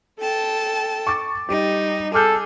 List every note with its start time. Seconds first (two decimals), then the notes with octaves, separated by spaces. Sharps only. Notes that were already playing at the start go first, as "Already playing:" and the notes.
0.18 A4 G5 A5
1.07 C#6 D6 A6
1.49 G3 D#4 G4
2.14 G#4 A4 D6 F6 G6